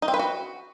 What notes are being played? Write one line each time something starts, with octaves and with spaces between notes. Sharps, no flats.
D#4
C4
B4
F#4